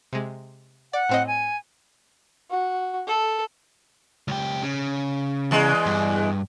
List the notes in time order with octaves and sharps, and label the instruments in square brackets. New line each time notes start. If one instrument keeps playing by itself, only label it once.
[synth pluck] C3 G#3
[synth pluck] D5 [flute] F#5
[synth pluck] A2 C4 D#5
[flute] G#5
[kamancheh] F#4
A4
[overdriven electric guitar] C#2 G4
C#3
[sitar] E2 G#3
[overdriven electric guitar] G2